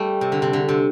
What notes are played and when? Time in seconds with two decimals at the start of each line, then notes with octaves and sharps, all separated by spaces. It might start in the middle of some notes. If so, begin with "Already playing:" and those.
Already playing: G3 A3
0.21 C3
0.32 D3
0.42 C3
0.53 D3
0.69 C3